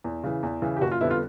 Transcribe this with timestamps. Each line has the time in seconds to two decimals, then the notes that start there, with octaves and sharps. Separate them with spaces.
0.04 E2
0.24 C#3 E3
0.43 E2
0.62 C#3 E3
0.77 G4
0.81 F#1 F#4
0.92 F4
1.01 F2 D3 G3 B3 E4
1.10 F4